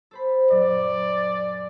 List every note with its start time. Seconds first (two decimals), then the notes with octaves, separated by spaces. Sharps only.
0.11 A4 C5 B5
0.51 F#2 A#2 F#3 D5